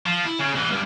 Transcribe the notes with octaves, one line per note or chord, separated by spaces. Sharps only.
F3
E4
C#3
C2 E3
D2 G2